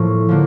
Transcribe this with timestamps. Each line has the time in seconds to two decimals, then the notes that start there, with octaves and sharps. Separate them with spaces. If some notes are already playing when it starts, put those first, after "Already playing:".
Already playing: A2 F3 A#3
0.29 D3 F3 A#3